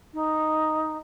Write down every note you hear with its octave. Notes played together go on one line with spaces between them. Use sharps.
D#4